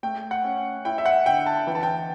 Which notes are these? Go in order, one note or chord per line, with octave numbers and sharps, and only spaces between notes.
A3 G5
F#5
C#4
E4 G5
E5
F#5
D3 G5
A5
E3 G5
A5
G5